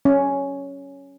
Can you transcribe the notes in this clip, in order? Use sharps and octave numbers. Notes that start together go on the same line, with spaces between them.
C#4